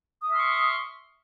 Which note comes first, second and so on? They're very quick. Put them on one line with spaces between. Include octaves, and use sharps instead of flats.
D#6 E5 F6 C6 C#6